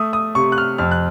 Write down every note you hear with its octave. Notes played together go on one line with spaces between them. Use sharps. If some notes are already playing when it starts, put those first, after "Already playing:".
Already playing: A3 D#6
D#6
C3 C#6
F#6
F6
F2 F6
F#6